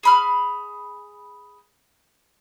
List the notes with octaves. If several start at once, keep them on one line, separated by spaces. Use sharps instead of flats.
G#4 B5 F6